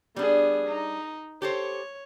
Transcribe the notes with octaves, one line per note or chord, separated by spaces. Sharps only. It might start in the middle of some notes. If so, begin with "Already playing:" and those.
G3 B3 D4 G#4
D#4
G4 A4 C5 C#5